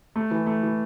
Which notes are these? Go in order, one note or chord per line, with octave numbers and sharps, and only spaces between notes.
A3
E3
A3
E3